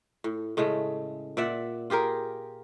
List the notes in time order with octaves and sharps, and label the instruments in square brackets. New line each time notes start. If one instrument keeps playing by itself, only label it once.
[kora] A2
A2 C#3 G#3 A3
A#2 D5 E5 F#5
F4 G4 G#4 A#4